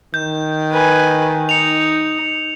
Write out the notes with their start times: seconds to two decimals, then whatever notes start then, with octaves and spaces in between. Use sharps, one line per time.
0.14 D#3 G6
0.72 B4 G#5
1.49 D#4 C#7 F7